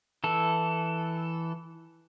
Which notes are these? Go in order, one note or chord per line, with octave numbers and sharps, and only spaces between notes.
E3 A4